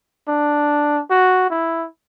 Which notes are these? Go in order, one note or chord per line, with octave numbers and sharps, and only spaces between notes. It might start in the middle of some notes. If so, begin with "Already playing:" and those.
D4
F#4
E4